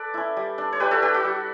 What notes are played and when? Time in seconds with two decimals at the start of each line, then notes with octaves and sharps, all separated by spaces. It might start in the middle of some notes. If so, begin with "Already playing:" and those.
Already playing: A4 B4 D5
0.14 C#4 E4
0.37 G3
0.58 D4
0.73 C#5
0.80 G3 G4 B4
0.91 F#4 A4
1.02 D4 G4
1.14 F#4
1.25 G3